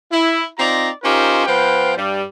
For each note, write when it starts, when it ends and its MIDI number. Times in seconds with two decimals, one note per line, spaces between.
0.11 0.45 64
0.59 0.90 60
0.59 0.90 63
0.59 0.90 65
0.59 0.90 74
0.59 0.90 82
1.04 1.45 61
1.04 1.45 63
1.04 1.45 65
1.04 1.45 67
1.04 1.45 70
1.04 1.45 72
1.46 1.92 53
1.46 1.92 59
1.46 1.92 71
1.46 1.92 72
1.46 1.92 77
1.46 1.92 79
1.97 2.22 43
1.97 2.22 55